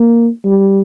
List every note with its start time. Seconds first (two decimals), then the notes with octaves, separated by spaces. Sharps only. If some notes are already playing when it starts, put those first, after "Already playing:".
Already playing: A#3
0.45 G3